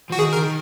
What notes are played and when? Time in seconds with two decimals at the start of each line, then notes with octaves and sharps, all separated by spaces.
0.11 F3 F#4
0.18 D#3 G#4
0.33 A#4
0.37 D#3